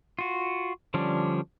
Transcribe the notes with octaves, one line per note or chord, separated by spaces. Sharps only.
F4 F#4
D3 F3 G3 C#4 D4